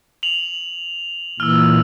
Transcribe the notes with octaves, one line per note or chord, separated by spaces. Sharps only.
F7 F#7
A#2 E3 E6 F6